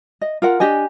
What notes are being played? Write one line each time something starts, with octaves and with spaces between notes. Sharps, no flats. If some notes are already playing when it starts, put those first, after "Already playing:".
D#5
F4 A#4 F#5
D4 G4 D#5 G#5